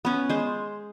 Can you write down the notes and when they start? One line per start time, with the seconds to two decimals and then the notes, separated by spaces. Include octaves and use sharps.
0.05 B3 C#4
0.30 G#3 C5